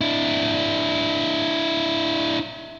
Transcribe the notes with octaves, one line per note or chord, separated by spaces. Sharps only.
D4 E4